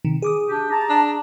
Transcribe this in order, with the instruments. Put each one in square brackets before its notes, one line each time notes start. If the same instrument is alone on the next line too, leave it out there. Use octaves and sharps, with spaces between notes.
[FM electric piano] C3 D#3
G#4 D6 D#6
[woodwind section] D4 G4
A5 A#5
[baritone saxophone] D4